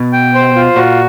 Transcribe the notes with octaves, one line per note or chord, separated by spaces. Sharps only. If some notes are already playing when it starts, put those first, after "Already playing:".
Already playing: B2
G5
C5
F4
A#2 F#4